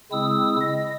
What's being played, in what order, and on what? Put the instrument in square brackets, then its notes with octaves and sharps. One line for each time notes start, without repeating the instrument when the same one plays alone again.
[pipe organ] C#3 G#3 C4 E4 D#6 E6
D#5